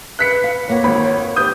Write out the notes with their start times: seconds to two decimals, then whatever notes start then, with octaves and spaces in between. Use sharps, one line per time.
0.19 B4 F#6 B6 C#7
0.44 F5
0.68 F2 A#3 C#5 F#5
0.84 G#1 B5
1.36 G4 D#6 G6